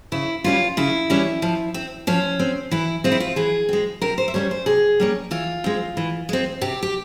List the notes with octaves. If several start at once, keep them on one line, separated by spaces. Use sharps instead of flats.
C#3 E4
E3 G3 C#4 F4
C#3 E4
E3 G3 C#4
F3
C4
F3 C#4
C4
E3 E4
G#3 C4 F4
E4
F4
E3 G#4
G#3 C4
C3 A#4
C5
E5
G3 A#3 C#4 C#5
C5
C3 G#4
G3 A#3 C#4
E3 F4
G#3 C4
E3
G#3 C4
C3 G4
G4